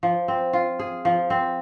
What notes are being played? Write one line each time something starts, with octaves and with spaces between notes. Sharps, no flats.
F3
C4
F4
G#4
F3
C4